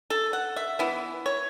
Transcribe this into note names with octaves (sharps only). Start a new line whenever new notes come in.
A4
F#5
E5
E3 B3 E4
C#5